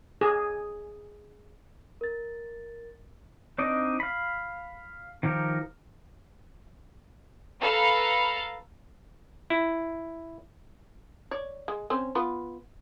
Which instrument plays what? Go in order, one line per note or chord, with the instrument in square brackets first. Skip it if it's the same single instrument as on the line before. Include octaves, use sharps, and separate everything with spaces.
[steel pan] G#4
[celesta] A#4 A6
[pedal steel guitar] C4 D4 D#4 D5 D#5
F5 B5
D#3 F3 G4 A#4
[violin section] A4 B4 F5 A#5
[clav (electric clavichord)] E4
[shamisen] C#5 D5
G#3
C4 C#4 C5
B3 F4 B4